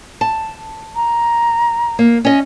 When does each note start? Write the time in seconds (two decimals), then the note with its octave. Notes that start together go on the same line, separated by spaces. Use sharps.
0.21 A5
0.96 A#5
1.99 A#3
2.25 C#4 D#5